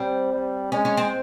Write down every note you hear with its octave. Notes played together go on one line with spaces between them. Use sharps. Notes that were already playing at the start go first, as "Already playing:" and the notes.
Already playing: G3 C4
G3
G#3 C#4
C#4
C4